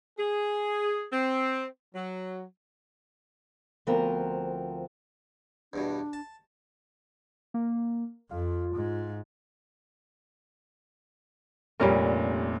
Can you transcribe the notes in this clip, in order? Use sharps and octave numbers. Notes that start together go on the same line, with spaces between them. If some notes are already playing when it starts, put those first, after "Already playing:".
G#4
C4
F#3
D2 F3 B3 C4 A#4 A#5
E2 G2 B2 D4
A5
A#3
F2 F4
G#2
F1 A#2 G3 C#4 A#4